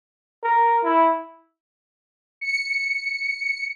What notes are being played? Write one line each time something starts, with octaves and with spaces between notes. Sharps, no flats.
A#4
E4
C#7